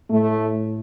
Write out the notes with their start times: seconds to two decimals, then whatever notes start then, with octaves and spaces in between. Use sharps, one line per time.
0.10 A2 A3